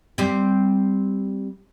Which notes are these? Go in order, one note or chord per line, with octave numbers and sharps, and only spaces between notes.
G3 C4